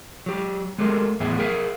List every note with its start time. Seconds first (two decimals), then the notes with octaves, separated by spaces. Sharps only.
0.26 F#3 G4
0.78 G#3 A3 G4 G#4 A#4
1.20 E2 A2 B3 G#4 E5
1.39 G#4 A#4 E5 F5